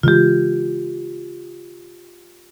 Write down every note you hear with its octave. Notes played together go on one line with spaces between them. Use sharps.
C#3 E3 G#3 F4 G4